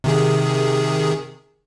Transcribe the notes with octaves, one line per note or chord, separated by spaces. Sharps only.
C3 D#3 G#4